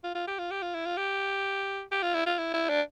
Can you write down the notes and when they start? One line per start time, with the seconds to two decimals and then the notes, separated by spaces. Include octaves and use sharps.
0.04 F4
0.15 F4
0.27 G4
0.39 F4
0.51 G4
0.62 F4
0.74 E4
0.86 F4
0.97 G4
1.92 G4
2.03 F4
2.14 E4
2.26 F4
2.38 E4
2.54 E4
2.69 D4